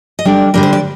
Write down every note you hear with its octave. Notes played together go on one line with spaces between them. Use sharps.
D#5
D3 G3 D4 D5
D3 G3 D4 A#4
C5
D5